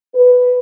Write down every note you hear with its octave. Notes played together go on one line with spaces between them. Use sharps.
B4